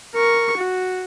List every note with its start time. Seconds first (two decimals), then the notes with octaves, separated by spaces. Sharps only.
0.15 A#4 C#6
0.57 F#4